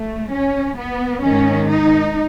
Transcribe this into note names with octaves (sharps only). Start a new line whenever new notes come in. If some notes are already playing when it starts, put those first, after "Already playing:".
Already playing: A3
C#4
B3
G#2 D#3 C#4
D#4